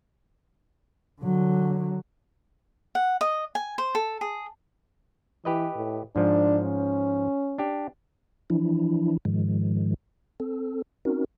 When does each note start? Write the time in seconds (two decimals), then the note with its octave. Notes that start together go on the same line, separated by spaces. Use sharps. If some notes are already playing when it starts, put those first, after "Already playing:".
1.21 D3 F#3
2.95 F#5
3.21 D#5
3.55 G#5
3.78 C5
3.95 A4
4.21 G#4
5.45 E3 G4 B4 D#5
5.76 A2
6.16 G#2 F3 D4
6.64 C#4
7.58 D4 G4
8.50 E3 F3 D4 E4
9.25 G#2 D#3 F3 G#3
10.40 C4 A4
11.05 C4 C#4 D#4 F#4 A#4